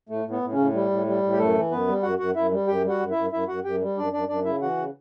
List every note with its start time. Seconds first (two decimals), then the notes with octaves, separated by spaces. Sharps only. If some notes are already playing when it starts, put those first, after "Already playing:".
0.09 A2 A3
0.25 A2
0.31 B3
0.42 A2
0.52 C#3 C#4
0.58 A2
0.73 G3
0.90 A2
1.06 G3
1.23 A2
1.32 G4
1.38 F#2 A3 A4
1.55 E3
1.71 F#2 B3 B4
1.87 G3
2.02 F#2 F#4 F#5
2.19 F#2 F#4 F#5
2.35 F#2 E4 E5
2.52 G3
2.67 F#2 G4 G5
2.84 G3 F#4 F#5
2.99 F#2
3.10 E4 E5
3.16 F#2
3.32 F#2 E4 E5
3.48 F#2 F#4 F#5
3.64 F#2 G4 G5
3.80 G3
3.97 F#2 D4 D5
4.13 F#2 D4 D5
4.29 F#2 D4 D5
4.45 C#3 E4 E5
4.62 E3 F#4 F#5
4.77 C#3